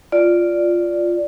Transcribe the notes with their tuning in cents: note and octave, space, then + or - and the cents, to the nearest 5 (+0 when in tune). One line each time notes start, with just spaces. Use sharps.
F4 -5 D5 +0